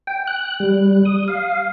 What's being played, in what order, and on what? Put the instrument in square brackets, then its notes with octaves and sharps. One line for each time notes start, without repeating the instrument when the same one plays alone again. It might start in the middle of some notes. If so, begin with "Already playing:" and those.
[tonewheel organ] G5
F#6
G3
D#6
F5